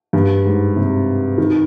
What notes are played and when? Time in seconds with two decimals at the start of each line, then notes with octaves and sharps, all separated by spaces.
0.13 G2
0.45 G#2
0.76 C3
1.38 D#3